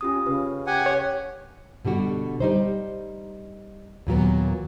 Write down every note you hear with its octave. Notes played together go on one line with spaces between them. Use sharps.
C#4 F4 G4 D#6
C#3 B4
G4 F#5 G#5
C#5
B2 D3 G3 F#4
G3 D#4 C5
D#2 A#2 F#3 B3